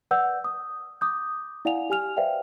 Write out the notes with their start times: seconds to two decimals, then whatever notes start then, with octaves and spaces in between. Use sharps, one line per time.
0.11 B4 D5 F#5 E6 G6
0.44 D#6
1.01 D6 D#6 G6
1.65 E4 D5 F5 F#5 G#5 F7
1.90 G4 G#5 F6 F7
2.17 B4 C5 D5 E5 F5 G5